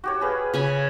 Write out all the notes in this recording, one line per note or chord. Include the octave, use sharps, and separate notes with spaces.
F#4 G4 C#5
G#4 B4 F5
C#3 G#5 B5